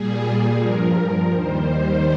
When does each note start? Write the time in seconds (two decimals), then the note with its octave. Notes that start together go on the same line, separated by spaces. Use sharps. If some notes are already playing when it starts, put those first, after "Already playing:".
Already playing: A#2 G3 G#4
0.60 G2 F3 A#4
1.32 D#2 D#3 G3 C5